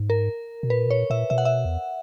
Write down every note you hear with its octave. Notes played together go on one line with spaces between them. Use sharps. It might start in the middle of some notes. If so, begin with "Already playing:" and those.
Already playing: G#2
A#4
B2
A#2 B4
B2
A#2 C#5
A#2 E5
B2 E5
F#5
E5
E2